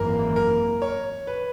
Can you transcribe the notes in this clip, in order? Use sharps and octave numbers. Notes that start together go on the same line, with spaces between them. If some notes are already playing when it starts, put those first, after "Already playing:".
Already playing: G#1 F#2 E3 A#3 A#4
A#4
C#5
B4